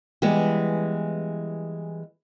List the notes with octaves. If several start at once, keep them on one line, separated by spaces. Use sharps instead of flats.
E3 G3 G#3 B3